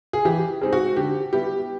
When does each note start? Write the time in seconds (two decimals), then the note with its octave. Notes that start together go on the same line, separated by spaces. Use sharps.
0.13 G#4
0.25 E3 G4
0.62 G#3 C4 D#4
0.73 F#4
0.96 D3 G4
1.32 G3 B3 E4 G4